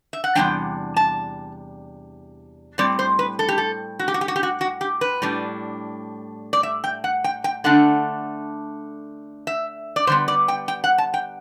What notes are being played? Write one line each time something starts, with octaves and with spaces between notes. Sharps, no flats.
E5
F#5
E2 C3 G3 D4 G5
A5
A2 G3 C4 D5
C5
B4
A4
G4
A4
F#4
G4
F#4
G4
F#4
G4
F#4
F#4
G4
B4
A2 G3 D4
D5
E5
G5
F#5
G5
G5
D3 A3 D4 F#5
E5
D5
D3 G3 B3 C5
D5
G5
G5
F#5
A5
G5